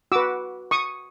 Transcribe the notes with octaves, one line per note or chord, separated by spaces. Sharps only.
F#4 B4 D6 E6
C#6 D#6